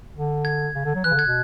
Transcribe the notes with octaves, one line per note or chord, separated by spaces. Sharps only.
D3
G#6
C#3
D3
F#3
E3 F#6
C#3
D3
G#6
B2